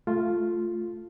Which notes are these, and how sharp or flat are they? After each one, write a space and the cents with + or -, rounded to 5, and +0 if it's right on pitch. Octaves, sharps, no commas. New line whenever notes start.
A3 +0 F4 +0